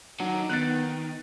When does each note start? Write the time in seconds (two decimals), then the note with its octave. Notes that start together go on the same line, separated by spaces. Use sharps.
0.20 D3 D#3 F#3 D#4
0.50 D#3 B3 F#6 A6